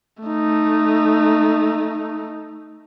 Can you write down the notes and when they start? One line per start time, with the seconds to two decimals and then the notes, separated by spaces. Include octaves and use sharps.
0.23 A3 D#4